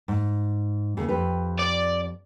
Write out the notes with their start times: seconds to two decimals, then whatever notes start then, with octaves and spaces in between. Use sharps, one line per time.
0.08 G#2
0.97 D#2 C#3
1.08 F2 G4 B4
1.59 D5